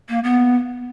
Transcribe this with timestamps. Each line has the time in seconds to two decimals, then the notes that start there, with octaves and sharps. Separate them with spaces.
0.09 A#3
0.24 B3